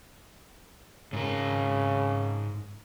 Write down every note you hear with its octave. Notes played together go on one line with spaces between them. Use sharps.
G#2 C#3 A#4